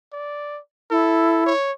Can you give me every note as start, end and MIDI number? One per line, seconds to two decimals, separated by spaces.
0.13 0.60 74
0.91 1.53 64
0.91 1.46 69
1.46 1.72 73